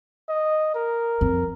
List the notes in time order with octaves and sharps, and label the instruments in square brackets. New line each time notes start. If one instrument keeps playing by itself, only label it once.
[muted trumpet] D#5
A#4
[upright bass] F2